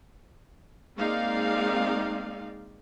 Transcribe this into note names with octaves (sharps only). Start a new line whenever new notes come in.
G#3 A#3 C4 D#4 D5 F5